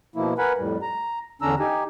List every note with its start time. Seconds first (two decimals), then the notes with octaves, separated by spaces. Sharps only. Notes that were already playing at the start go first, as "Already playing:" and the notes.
0.16 B2 F3 A#3 E4
0.38 A#4 B4 F#5 G#5 B5
0.58 F2 A2 G3
0.82 A#5
1.42 E2 D3 C#4 D4 A#5 E6
1.59 D#4 G4 G#5